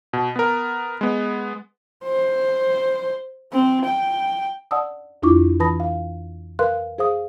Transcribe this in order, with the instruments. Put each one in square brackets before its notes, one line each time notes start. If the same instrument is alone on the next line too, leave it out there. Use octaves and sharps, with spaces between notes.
[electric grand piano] B2
B3 A#4
G#3 B3
[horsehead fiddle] C5
C4
G5
[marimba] D5 F#5 A5 D#6 E6
F2 D4 E4 F4 C#6 D6
E3 B4 A5 B5 D#6 A#6
F5
A#4 B4 F5 C6 F#6
G#4 C5 F5 D#6